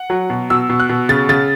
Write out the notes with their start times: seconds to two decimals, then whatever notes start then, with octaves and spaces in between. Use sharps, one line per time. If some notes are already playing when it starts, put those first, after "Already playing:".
Already playing: F#5
0.10 F#3
0.30 B2
0.50 B2 E6
0.70 B2
0.80 F#6
0.89 B2
1.09 C#3 A6
1.29 C#3 A6